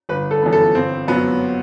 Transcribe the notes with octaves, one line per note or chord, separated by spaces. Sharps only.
G1 B4
A4
F#2 E3 B3
A4
G1 C4
F#2 F#3 B3